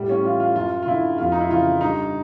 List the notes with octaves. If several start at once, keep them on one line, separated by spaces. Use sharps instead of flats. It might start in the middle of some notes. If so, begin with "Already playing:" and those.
Already playing: A2 G3
C#4
E3 F4
F4
F#2 F4
F4
D3 E4
F2 F4
D#4
E4
C#3 E3 F4
G2 D#4